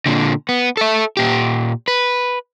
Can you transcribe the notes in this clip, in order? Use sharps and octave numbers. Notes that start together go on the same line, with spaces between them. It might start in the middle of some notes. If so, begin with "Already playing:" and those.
A#2 D3
B3
A4 E5
A#2 G4
B4